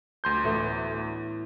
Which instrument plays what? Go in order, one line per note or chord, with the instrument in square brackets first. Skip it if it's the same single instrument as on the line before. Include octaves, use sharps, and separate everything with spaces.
[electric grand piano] D2 C6 G6
[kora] A2 E3 B3